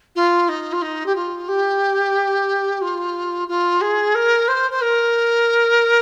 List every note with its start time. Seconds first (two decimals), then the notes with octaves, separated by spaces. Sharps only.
0.15 F4
0.48 D#4
0.72 F4
0.81 D#4
1.05 G4
1.15 F4
1.48 G4
2.81 F4
3.48 F4
3.81 G#4
4.14 A#4
4.48 C5
4.70 C5
4.81 A#4